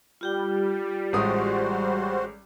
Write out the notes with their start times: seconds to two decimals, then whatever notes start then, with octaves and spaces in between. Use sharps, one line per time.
0.21 G3 F4 G4 G5
1.13 A1 G#3 F#4 C5 D#6